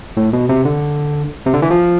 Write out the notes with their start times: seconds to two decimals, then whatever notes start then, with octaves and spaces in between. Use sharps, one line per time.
0.17 A2
0.33 B2
0.49 C3
0.65 D3
1.46 C3
1.54 D3
1.62 E3
1.70 F3